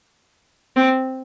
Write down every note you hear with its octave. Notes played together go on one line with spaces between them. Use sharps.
C4